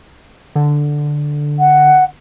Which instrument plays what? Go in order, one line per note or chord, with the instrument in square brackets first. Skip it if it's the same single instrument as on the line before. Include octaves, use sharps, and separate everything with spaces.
[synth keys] D3
[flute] F#5